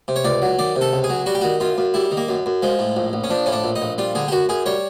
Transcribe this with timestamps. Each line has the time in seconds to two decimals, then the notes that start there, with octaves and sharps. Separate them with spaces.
0.08 C3
0.16 C#5
0.25 C#2 D5
0.42 F#3
0.59 D#3 D5
0.76 C3
0.81 A4
0.93 C#2
1.04 G#4
1.10 F#3
1.26 G3 F#4
1.35 G4
1.41 D#3 F#4
1.60 F#2 F4
1.78 F#2
1.94 G3 E4
2.11 D#3
2.17 A#3
2.28 F#2
2.46 F#2
2.62 F3 G#3
2.79 A2
2.96 A#1
3.13 A#1
3.24 C#4
3.30 F3 D4
3.46 A2 C#4
3.53 D4
3.64 A#1
3.76 D#4
3.82 A#1
3.98 G3 F4
4.15 D3 G#4
4.28 G4
4.32 F#2 F#4
4.49 F#2 G#4
4.66 G3 C#5